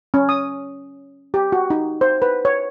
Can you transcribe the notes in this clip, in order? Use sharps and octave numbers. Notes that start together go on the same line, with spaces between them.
C#4
D#6
G4
F#4
D#4
C5
B4
C#5